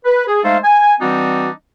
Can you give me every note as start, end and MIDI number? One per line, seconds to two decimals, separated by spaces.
0.05 0.23 71
0.27 0.39 68
0.43 0.57 56
0.43 0.57 57
0.43 0.57 63
0.43 0.57 69
0.43 0.57 72
0.43 0.57 77
0.64 0.94 80
1.00 1.49 52
1.00 1.49 55
1.00 1.49 60
1.00 1.49 62
1.00 1.49 63
1.00 1.49 66